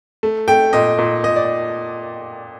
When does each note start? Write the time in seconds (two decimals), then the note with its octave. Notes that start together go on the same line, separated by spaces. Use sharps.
0.23 A3
0.48 A3 G5
0.73 A#2 D#5
0.99 A#2
1.24 A#2 D#5
1.36 D5